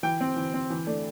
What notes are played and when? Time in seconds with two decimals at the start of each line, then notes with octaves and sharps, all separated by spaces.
0.03 E3 G5
0.21 C4
0.36 E3
0.54 C4
0.70 E3
0.87 A3 D4